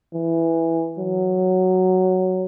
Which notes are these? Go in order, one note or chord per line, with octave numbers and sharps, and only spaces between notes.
E3
F#3